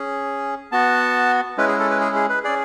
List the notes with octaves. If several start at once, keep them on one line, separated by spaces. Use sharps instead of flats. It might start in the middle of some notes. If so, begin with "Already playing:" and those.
Already playing: C#4 G#4
B3 F#4 A5
G#3 C#4 E4 B4
G#4
A4
B4
G#4
G#4
B4
C#4 G#4 D5